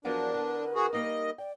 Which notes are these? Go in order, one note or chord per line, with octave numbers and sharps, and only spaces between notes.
E2 F3 F#3 D4 A#4
D3 B3
F#4 G#4
G3 A#3 D#4 D#5
D5 G5